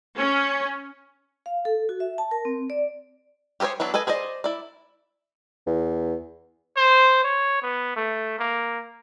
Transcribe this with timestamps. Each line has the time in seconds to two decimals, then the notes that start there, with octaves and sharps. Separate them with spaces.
0.17 C#4
1.46 F5
1.65 A4
1.89 F#4
2.00 E5
2.18 A5
2.31 A#4
2.45 C4
2.70 D5
3.60 G4 G#4 A#4 C5 C#5
3.80 F#3 B3 D4 E4
3.94 A4 B4 D#5 G#5
4.07 G#4 C5 D5 D#5
4.44 E4 D5
5.67 E2
6.77 C5
7.24 C#5
7.62 B3
7.97 A3
8.39 A#3